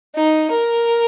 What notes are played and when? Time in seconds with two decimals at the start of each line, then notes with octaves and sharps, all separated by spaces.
0.16 D#4
0.50 A#4